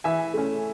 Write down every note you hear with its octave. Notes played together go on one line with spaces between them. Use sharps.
E3 E5 G#5
A3 C#4